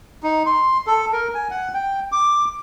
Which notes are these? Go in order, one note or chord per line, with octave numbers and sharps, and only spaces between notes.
D#4
C6
A4
A#4
G#5
F#5
G5
D6